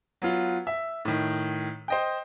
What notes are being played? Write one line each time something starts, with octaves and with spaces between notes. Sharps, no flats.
F#3 B3 F4
E5
A2 D#3
C5 D#5 G5